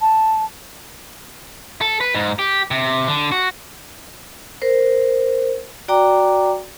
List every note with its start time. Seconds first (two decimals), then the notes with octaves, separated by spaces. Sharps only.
0.01 A5
1.81 A4
2.01 B4
2.14 G#2
2.39 G4
2.71 C3
3.08 D3
3.32 F#4
4.62 A#4 C5
5.88 F#4 D5 G5 A#5 D6